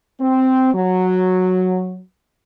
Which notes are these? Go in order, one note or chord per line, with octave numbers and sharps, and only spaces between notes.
C4
F#3